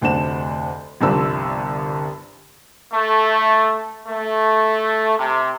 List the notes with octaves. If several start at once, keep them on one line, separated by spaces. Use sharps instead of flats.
F1 D2 C4 D4 F#5 E7
G1 C2 F3 D4 E6
A3
A3
C3